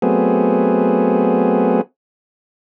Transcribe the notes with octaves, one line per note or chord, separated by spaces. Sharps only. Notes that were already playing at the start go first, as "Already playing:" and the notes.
F#3 A3 B3 C4 G#4